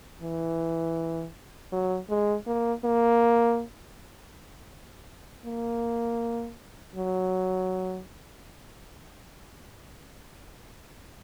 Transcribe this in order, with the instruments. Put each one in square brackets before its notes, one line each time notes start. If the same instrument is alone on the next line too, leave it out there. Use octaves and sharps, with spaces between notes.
[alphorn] E3
F#3
G#3
A#3
A#3
A#3
F#3